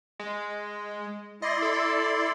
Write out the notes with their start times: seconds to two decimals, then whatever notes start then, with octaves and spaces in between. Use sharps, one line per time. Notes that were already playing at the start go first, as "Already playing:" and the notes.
0.19 G#3
1.42 E4 D5 D#5 C6
1.62 A4